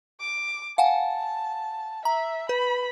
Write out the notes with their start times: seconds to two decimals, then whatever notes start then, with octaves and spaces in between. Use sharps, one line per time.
0.20 D6
0.78 F5 F#5 G#5 A5
2.05 E5 A#5
2.49 B4 B5